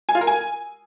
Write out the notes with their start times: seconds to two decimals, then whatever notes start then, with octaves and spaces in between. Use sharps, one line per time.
0.09 G#5
0.15 F4
0.21 A#4
0.27 G#5